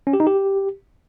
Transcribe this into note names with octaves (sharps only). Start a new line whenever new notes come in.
C#4
G4
D#4
G4